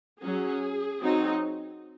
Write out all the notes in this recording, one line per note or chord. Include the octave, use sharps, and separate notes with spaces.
F#3 C#4 G#4
F#3 C4 D#4